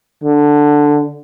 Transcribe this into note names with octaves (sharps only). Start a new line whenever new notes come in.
D3